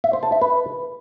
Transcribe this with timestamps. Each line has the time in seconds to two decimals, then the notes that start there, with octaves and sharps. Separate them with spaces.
0.04 E5
0.13 C5
0.23 A5
0.32 E5
0.42 B4